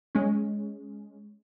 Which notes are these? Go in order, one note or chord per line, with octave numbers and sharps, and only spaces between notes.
G#3 C#4